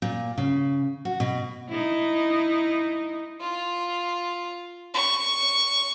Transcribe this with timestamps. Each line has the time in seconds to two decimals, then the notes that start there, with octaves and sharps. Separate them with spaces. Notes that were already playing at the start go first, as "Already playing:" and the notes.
0.02 A#2
0.38 C#3
1.05 F#4
1.20 B2
1.69 D#4 E4
3.40 F4
4.94 C#6